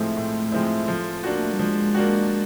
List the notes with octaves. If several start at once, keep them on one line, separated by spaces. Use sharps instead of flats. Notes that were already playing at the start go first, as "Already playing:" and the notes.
Already playing: A2 F3 G#3 A3 C4 E4
A2
F3 G#3 C4 E4
F3
A#3 D4 F#4
G3
F3 G#3
A#3 D4 F#4